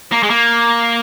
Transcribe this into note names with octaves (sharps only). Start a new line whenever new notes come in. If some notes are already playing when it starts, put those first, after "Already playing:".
A#3
G#3
A#3